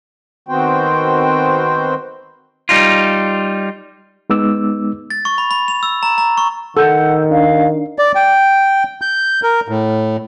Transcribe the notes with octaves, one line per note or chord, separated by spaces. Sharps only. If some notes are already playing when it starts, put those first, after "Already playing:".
D#3 B3 C4 F#4 C5 G5
G3 D#4 F4
G#3 B3 D#4 D6 E6
A6
C#6
B5
B5
F7
E6
A#5
A#5
C#6
D#3 A4 F#5 E6 G6
D4 F5
D5
G5
G6
A#4
A2